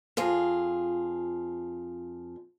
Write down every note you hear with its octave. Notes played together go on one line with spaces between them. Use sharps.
F2 F4 G#4